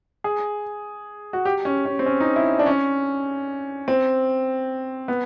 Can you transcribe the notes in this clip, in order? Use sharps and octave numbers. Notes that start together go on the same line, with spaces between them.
G#4
F#4
G4
C#4
C#4
C4
C#4
D#4
E4
D4
C#4
C4
B3